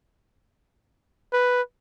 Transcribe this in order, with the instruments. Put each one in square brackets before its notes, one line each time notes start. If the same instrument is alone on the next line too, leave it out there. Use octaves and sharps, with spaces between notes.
[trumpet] B4